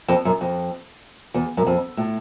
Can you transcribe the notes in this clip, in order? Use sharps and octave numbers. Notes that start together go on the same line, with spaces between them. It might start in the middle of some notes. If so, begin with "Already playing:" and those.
F2
F#2
F2
E2
F#2
F2
A2